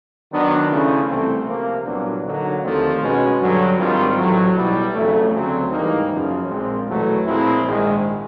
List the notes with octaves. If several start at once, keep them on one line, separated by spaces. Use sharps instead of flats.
D#3 F#3 B3 D4
C#3 F3 A3 C#4 E4
C2 C3 E3 A3 C4
C3 F3 A#3
C2 A#2 F#3 B3 D4
D3 F#3 A#3 D#4
D#2 D3 F3 A3 C4
B2 G#3 C#4 F#4 B4
G2 D3 F#3
G#2 D#3 G3 C4 F4
A1 A2 F#3
B1 B2 G3 B3 E4
F2 C#3 F#3 A3
D2 C#3 F#3 A3 C4
G#2 E3 G3 A#3 D#4
F#2 C#3 F3
A#1 A#2 F3 G#3 C4
E2 B2 F#3 A3
A#2 F3 G#3 C4 E4
A#1 G#2 D#3 G#3